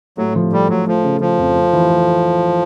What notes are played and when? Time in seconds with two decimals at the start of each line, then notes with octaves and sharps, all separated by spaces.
0.18 A2 F#3
0.35 F3
0.52 G3 A3
0.69 A2 F#3
0.87 F3 A3
1.04 C#3
1.21 C#3 F3
1.39 F2
1.55 A3
1.73 E3
1.90 A3